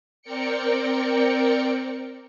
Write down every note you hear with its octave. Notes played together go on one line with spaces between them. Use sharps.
C4 A#4 D5 G5 C#7